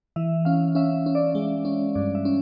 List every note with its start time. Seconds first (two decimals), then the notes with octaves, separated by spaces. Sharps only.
0.16 E3 E5
0.45 C#4 F5
0.75 C#4 E5
1.06 C#4
1.15 D5
1.35 G#3
1.65 C#4
1.95 G2 D5
2.15 E5
2.25 C#4